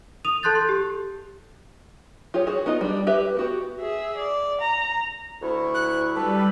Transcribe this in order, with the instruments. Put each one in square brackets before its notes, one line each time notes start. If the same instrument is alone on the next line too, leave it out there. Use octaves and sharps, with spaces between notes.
[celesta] D#6 D#7 F7
A4 A5 C6 F#6 G6 A6
C6
G4
[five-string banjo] F4 G4 G#4 C#5
F#4 G#4
B3 D#4 F4 D#5
G3 D4
G4 B4 E5
B3 F#4 G4
[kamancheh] G#4 E5
D5
A#5
[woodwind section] D2 E4 C#6
[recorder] F#6
[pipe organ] G3 [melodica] D4 G4 A4 [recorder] B4